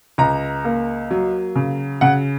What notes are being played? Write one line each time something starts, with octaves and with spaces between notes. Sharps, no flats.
C#2 A#5
A#3
F#3
C#3
C#3 F#5